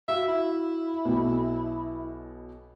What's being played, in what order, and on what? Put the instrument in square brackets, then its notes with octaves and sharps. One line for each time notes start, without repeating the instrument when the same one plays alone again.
[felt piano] F#4 F5 [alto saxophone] E5
[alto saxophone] E4
[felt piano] B1 B2